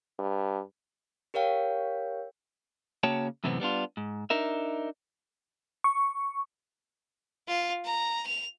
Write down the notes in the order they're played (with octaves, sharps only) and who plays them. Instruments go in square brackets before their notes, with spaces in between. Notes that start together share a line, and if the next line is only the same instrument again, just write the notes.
[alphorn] G2
[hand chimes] G4 A#4 C#5 F5 G5
[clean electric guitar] C#3 A#3 F#4 C#5 G5 A5
F#2 A2 C3 E3 B3 C4
G3 B3 D4 F4
G#2
D4 D#4 A#4 E5
[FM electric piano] C#6
[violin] F4
A#5
F7